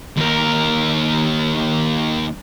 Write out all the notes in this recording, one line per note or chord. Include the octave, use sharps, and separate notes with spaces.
D#2 A#4